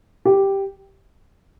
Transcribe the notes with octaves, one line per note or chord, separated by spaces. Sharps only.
G4